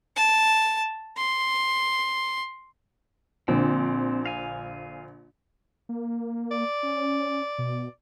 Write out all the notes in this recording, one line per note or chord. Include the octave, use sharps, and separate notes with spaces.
A5
C6
A#1 D3 C4
F5 G#5
A#3
D5
C#4
B2